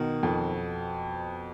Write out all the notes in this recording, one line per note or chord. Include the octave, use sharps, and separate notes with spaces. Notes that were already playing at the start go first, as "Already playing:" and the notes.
Already playing: B2 D#3
F2